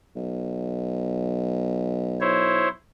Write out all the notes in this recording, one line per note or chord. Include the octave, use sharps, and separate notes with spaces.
B1
E4 C5 C#5